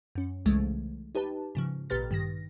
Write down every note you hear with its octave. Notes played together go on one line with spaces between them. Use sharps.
F#2 C#4
C2 C#3 E3 G#3 A3
D#4 G4 B4 A5
G#2 C#3 F3
A1 A#2 G4 B4 F6 A6
G2 D#3 A#6